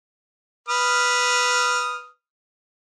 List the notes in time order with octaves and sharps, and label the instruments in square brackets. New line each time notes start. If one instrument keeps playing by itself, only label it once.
[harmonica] B4 D#6 F6